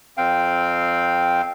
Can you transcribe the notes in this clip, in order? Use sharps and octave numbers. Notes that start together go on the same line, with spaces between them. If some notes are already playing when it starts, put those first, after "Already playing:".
F2 C4 F5 G5